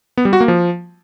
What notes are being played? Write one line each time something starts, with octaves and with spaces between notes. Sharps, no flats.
B3
G3
F#4
A#3
F3